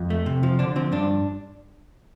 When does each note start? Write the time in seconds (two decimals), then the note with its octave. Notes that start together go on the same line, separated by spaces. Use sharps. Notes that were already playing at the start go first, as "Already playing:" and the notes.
Already playing: F2
0.10 A3
0.26 C3
0.43 F3
0.59 D3 D4
0.76 F3 C4
0.92 G2 D4